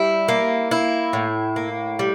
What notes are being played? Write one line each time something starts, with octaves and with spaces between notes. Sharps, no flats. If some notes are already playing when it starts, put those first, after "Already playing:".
Already playing: G3 E4
A#3
E4
A2
A#3
G3